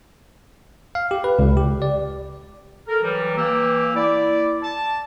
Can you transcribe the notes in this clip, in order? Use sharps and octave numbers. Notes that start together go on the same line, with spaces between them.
F5
G4
B4
C#2
G4
D5
A4 A#4
E3 F#3 G3
E3 A#3 G4 E6
E4 D5 D6
A5